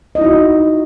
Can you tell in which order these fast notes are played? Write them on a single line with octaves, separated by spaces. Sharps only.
D#5 E4 D#4 F#4